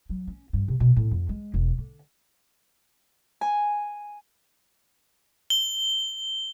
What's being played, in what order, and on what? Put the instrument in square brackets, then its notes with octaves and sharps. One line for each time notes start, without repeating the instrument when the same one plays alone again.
[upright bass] F#3
C#4
G2
C3
B2
A2
F2
G#3
E1
D3
[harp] G#5
[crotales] G7